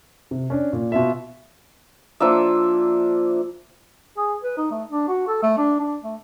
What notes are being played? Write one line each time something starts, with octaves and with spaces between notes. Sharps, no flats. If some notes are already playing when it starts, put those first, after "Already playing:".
C3
C#4 D4
A#2
B2 F4 E5
F3 A#3 D4 E5
G#4
B4
D#4
A3
D4
F#4
A4
A3
D4
D4
A3